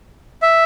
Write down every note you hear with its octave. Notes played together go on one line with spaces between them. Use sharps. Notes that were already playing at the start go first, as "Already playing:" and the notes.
E5